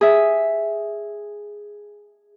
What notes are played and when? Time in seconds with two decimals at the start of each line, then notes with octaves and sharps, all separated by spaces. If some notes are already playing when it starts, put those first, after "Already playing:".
0.01 G#4 E5